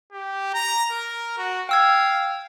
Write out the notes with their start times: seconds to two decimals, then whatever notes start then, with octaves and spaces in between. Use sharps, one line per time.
0.12 G4
0.54 A#5
0.92 A#4
1.38 F#4
1.69 F5 G5 E6 G#6